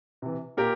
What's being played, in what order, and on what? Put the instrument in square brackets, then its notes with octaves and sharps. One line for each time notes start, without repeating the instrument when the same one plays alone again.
[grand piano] C3 E3
A#2 G4 A#4